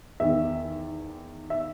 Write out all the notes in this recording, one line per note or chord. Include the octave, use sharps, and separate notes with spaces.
E2 D#3 E5
E5